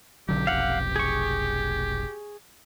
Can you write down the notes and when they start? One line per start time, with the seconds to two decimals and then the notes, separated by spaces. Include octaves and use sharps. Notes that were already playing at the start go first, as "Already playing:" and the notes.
0.29 B1 D3 F#3 G4
0.47 F1 B1 F5 F#5
0.96 G#4 C#6